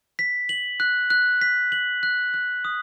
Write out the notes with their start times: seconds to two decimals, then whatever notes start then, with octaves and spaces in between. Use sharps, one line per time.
0.19 B6
0.49 F#7
0.80 F#6
1.10 F#6
1.42 B6
1.72 F#7
2.03 F#6
2.34 F#6
2.65 D#6